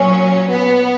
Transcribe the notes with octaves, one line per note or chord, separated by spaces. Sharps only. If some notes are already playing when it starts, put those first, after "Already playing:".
Already playing: A#2 F#3 C#4
B3